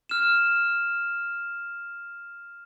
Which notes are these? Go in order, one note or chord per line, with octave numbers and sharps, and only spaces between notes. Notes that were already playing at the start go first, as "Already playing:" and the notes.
F6 E7